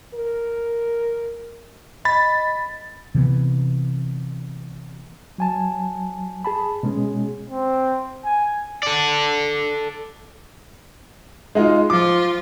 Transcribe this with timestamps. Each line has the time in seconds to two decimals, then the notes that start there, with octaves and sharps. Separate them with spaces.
0.14 A#4
2.05 D#5 B5 A6
3.15 C3 E3 B3
5.38 F#3 G#5 A5
6.45 G#4 A5 B5
6.83 B2 G#3 C#4 G#4
7.50 C4
8.25 G#5
8.83 A4 D5
11.55 G#3 D#4 F4
11.90 F3 F4 D6